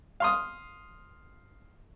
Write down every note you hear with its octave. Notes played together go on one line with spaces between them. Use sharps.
F5 C6 D#6